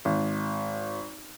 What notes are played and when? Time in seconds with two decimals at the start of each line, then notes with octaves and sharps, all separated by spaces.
0.05 G#1